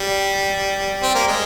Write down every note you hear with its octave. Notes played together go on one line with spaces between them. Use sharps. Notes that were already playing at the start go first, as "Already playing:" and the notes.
Already playing: G3
C4
A#3
G#3